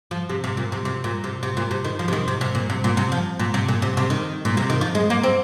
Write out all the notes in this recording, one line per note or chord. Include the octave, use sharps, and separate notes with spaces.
F3
C3
C3
A#2
C3
C3
A#2
C3
C3
A#2
C3
D#3
F3
C3
D#3
C3
C3
A#2
C3
A#2
C3
F3
A#2
C3
A#2
C3
C3
D#3
A#2
C3
D#3
F3
G#3
A#3
C4